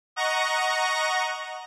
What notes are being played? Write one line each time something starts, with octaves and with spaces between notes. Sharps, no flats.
D#5 F#5 A#5 C#6 A#6